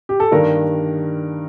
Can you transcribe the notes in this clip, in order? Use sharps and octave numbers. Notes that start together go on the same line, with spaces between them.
G4
A4
G2 D#3 A#3 D4 A#4